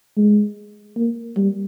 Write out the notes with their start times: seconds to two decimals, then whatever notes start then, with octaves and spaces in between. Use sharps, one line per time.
0.17 G#3
0.96 A#3
1.37 G3